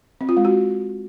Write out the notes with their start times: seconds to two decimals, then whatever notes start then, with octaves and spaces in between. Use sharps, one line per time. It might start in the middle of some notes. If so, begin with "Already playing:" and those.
0.21 C4
0.29 F4
0.37 G#3
0.45 F#4